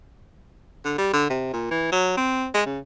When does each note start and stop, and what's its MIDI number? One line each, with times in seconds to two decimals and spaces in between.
0.85 0.97 50
0.98 1.11 55
1.13 1.27 50
1.30 1.52 48
1.53 1.67 46
1.71 1.90 52
1.92 2.13 54
2.17 2.48 60
2.54 2.65 56
2.66 2.79 49